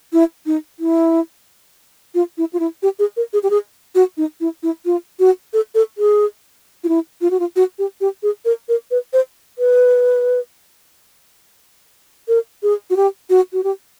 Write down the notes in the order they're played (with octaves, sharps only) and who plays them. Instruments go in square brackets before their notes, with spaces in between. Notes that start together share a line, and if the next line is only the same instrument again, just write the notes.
[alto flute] E4
D#4
E4
F4
E4
F4
E4
G4
G#4
A#4
G#4
G4
G#4
F#4
D#4
E4
E4
F4
F#4
A4
A4
G#4
F4
E4
F4
F#4
F4
F#4
G4
G4
G#4
A#4
A#4
B4
C5
B4
A#4
G#4
F#4
G4
F#4
F#4
G4